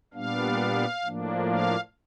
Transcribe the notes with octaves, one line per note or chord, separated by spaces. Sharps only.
A#2 G3 B3 D4 F5
A2 F3 A#3 D4
F5